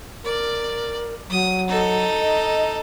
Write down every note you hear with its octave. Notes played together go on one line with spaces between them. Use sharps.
A#4 D5
F#3 D#6
D#4 A4
D#5